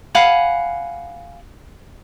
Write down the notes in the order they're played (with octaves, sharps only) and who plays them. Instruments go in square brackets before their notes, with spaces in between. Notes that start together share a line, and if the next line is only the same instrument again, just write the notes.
[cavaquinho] F5 F#5 G#5 B5